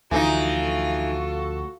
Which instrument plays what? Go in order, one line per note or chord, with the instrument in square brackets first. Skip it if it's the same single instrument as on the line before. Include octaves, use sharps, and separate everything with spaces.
[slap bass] D2 F3 [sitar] E3 D#4 [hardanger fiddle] F4 [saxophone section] F#4 A4